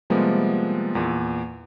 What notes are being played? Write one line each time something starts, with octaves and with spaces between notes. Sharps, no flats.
C3 F3 G3 G#3 A#3 B3
E2 A#2